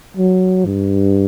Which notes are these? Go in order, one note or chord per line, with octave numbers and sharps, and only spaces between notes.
F#3
G2